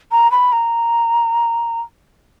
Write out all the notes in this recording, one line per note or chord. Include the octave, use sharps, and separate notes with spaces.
A#5
B5
A#5